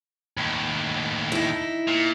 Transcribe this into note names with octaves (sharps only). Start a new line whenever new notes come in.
D#2 A2
D#4 E4
A#2